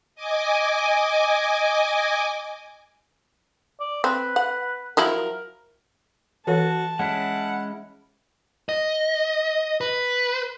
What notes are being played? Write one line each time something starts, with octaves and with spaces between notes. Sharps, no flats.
D#5 G#5 D6
D5
C4 B4
F#5
F3 F#3 E4 A#4
E3 F#4 A4 C#5 A5
G#3 C#4 E4 F#5
D#5
B4